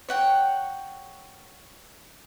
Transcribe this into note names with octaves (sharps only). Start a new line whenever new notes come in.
C#5 F#5 G5